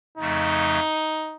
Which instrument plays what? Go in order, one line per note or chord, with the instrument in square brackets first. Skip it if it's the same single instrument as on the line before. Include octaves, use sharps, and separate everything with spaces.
[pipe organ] F2 C#3 F3 A3 [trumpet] D#4